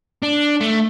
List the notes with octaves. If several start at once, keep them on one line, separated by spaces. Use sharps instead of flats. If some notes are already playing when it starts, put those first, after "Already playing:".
D4
A3